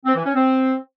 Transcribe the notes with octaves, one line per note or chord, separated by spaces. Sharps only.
C4
E3
C#4
C4